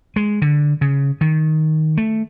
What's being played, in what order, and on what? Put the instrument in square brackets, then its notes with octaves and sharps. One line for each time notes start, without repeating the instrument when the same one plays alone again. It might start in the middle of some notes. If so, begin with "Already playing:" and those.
[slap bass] G#3
D3
C#3
D#3
A3